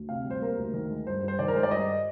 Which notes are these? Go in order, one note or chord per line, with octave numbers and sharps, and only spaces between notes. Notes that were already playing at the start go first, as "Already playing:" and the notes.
Already playing: D2
C3 F5
G3
C5
A#3 A#4
D2
D#3 A#4
G#3
G2 C5
G2
C5
D#3 D5
A#4
G#3 C5
D5
G2 D#5